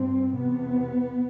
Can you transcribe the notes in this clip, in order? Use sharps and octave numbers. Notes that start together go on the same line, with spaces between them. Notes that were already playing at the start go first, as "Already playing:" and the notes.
Already playing: G2 C4
E2 C3 B3